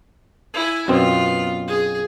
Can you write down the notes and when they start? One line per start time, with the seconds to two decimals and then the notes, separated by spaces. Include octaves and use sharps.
0.54 E4 G#5
0.88 F#2 B2 B3 C4 F4
1.68 G#4